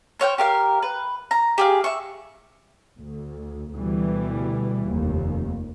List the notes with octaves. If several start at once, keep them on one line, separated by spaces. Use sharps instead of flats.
C5 C#5 F#5 G5
G4 A#4 F5
B4
A#5
G4 G#4 F5
E5 C#6
D2
D2 B2 E3 G3
F1 D#2